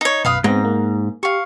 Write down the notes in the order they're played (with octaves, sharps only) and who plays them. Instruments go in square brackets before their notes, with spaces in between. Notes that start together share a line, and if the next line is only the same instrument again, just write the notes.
[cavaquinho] D#4 C#5
[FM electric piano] B1 F#2 [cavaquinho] B4 F5 D#6
[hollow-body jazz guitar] G#2 [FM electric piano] B3 C4 [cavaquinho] A#5
[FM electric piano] A#3
[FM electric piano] G4 [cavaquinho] F5 C#6